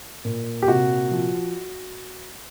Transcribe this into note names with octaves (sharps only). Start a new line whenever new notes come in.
A#2
G4
C3 F#4
F3